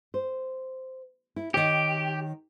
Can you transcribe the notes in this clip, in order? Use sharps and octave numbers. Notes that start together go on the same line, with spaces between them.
C5
E4
D#3 G4 C#5